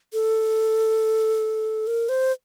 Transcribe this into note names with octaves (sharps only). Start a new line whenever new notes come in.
A4
A#4
C5